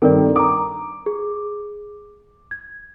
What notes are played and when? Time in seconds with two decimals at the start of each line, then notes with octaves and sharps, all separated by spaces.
0.02 G2 D#3 C4 A4 A#4 D5
0.36 A#5 D6 D#6
1.06 G#4
2.51 G#6